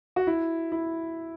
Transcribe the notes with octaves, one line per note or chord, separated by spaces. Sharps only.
F#4
E4
E4